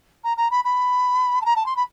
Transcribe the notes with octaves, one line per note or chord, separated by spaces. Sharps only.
A#5
A#5
B5
B5
A5
A#5
A5
C6
B5